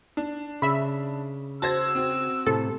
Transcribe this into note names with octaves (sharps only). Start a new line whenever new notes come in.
D4
C#3 E5 B5
F#4 C5 A5 E6 G#6 A#6
C4 F#4
A2 C3 A4